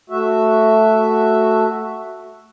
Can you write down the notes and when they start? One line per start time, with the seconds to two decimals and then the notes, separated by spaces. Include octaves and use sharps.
0.10 A3 F#4 E5